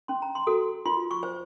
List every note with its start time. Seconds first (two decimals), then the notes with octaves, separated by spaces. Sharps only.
0.08 C#4 C6
0.22 A#5
0.35 C6
0.47 F#4 A4
0.86 F4 C6
1.11 C#6
1.23 C5